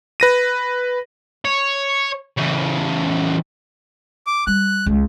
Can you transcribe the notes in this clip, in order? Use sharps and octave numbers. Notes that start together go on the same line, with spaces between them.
B4 A#6 D#7
C#5
C#3 E3
D6
G3 F#6
C#2